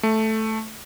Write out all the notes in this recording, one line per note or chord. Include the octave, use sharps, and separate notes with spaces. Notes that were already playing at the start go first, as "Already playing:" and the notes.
A3